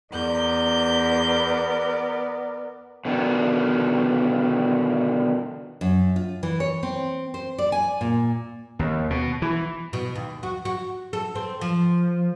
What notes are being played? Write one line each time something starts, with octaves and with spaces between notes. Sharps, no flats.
E2 B3 A#4 D5 G6
B2 D3 D#3
F#2
F4
E3
C#5
C4
C5
D5
G#5
A#2
D#2
B2
E3
B2
D#2
F#4
F#4
A4
C4
F3